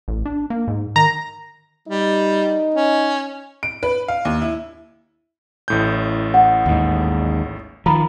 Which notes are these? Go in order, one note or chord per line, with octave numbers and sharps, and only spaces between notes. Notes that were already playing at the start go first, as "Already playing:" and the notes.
A1
D4
A#3
G#2
D#3 A#5
G3 D#4
C#4
D7
B4
F5
D#2
E4
A1 A2 G6
F#5
D#2 G#2
D#3 F3 A#5 B5